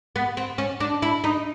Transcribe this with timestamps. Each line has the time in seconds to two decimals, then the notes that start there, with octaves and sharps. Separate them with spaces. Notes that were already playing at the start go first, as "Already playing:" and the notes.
0.16 B3
0.37 C4
0.58 C#4
0.80 D4
1.02 E4
1.24 D#4